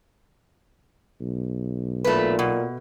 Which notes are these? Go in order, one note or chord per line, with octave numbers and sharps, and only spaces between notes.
B1
A#2 A3 B4
B2